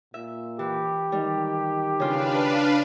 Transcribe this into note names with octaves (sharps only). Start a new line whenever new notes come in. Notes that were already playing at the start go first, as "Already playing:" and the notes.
A#2 E5
E3 G4
D#3 G3
C#3 D4 F4 B4 F5